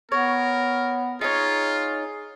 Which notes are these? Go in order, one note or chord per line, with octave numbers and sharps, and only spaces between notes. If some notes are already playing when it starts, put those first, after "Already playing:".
B3 A#4 C#5
D#4 F4 G#4 C#5